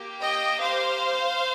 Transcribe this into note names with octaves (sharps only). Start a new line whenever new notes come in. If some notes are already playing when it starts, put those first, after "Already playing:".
Already playing: A#3 G4
D#5 G5
C5 F5